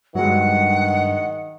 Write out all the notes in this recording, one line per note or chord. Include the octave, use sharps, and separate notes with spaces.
G2 D#3 F#3 G#3 F#5